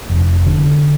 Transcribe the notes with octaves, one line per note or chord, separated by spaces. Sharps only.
F1
D3